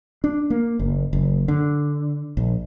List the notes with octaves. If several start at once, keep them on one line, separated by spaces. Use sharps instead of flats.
D4
A#3
F#1
F#1
D3
A#1